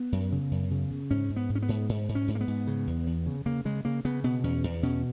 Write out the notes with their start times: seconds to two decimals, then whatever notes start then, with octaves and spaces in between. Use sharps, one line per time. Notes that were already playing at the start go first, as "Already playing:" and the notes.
Already playing: B3
0.12 F#2
0.32 C#3
0.51 F#2
0.71 C#3
0.91 C#3
1.11 G#2 C#4
1.30 G#2
1.36 B3
1.49 G#2
1.55 C#4
1.62 B3
1.69 G#2
1.89 G#2
2.09 G#2
2.15 C#4
2.28 G#2
2.35 A#3
2.41 B3
2.48 G#2
2.67 C#3
2.87 E2
3.07 E2
3.26 C#3
3.46 C#3 A#3
3.65 C#3 G#3
3.85 C#3 A#3
4.05 C#3 B3
4.24 B2 B3
4.44 E2 C#4
4.64 E2
4.83 B2 C#4